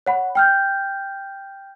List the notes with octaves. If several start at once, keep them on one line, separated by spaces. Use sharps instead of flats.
C#5 F#5 B5
G5 F6 G6